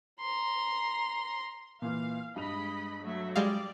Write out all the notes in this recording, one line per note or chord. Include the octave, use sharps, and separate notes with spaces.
A#5 C6
A#2 E3 F5
G2 G#3 D#5 B5 F7
F#3 A3 E5
G3 G#3 D5 F5